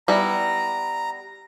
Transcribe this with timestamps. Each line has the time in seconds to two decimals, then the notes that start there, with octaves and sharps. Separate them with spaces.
0.08 G3 B3 E4 A#5